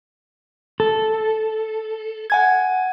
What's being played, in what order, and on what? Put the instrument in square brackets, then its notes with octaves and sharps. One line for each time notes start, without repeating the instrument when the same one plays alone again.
[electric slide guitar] A4
[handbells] F#5 G#5 G#6